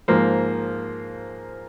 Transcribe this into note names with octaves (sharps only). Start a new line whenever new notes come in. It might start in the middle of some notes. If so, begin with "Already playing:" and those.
G#2 F3 A#3 C5